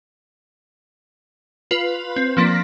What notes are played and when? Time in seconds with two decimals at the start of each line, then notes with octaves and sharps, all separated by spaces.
1.71 F4 B4
2.16 C4
2.37 F3 A#3 D4 A#6 B6